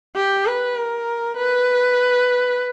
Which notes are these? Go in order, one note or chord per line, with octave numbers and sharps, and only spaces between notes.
G4
B4
A#4
B4